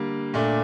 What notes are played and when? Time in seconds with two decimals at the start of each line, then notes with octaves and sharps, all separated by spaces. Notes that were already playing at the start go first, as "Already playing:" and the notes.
Already playing: D3 G3 A#3
0.34 A#2 A3 D4